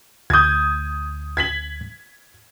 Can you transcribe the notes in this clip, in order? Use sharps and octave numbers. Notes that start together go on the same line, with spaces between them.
D2 D#6 G6 G#6
G#6 B6 F#7